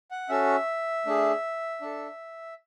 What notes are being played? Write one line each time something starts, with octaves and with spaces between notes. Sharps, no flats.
F#5
C#4 F#4 A4 E5
A3 D4 G#4
D4 A4